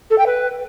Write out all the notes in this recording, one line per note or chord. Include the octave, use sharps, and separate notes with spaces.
A4
G5
B4